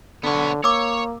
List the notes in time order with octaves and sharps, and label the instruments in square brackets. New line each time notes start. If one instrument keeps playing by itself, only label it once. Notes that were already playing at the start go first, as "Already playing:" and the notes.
[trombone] D3 [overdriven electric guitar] B3 C#5
[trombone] A#3 [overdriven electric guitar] C#5 [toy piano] D6 E6